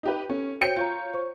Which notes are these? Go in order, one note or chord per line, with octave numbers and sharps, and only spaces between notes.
D#4 G4 B4
C#4 A4
F#4 C5 C#5 G5 G6 C#7
F4 C#5 A#5 G6
C5 C#6